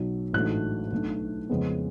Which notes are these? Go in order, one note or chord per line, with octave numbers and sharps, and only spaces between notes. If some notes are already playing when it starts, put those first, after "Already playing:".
Already playing: B1 B2 F#3
A1 G#2 F#3 A3 D4 F#6
B1 B2 A3 D4
F2 C#3 G#3 B3